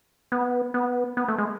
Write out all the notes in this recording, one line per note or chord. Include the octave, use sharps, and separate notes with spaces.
B3
B3
B3
A3
G#3